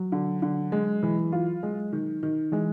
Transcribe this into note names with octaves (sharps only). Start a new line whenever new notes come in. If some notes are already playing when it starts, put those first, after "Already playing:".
Already playing: F#3
D3
D3
G#3
E3
F4
G#3
D#3
D#3
E3 G#3